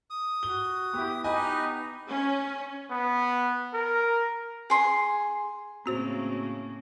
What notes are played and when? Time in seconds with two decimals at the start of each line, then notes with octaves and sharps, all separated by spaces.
0.10 D#6
0.43 F#4 G7
0.94 B3 E4 G4
1.24 D#4 G4 B4 D#5 G#5
1.54 B3
2.10 C#4
2.91 B3
3.73 A#4
4.70 G#4 C6
5.86 A2 C#3 A#3 C4 F#4 C5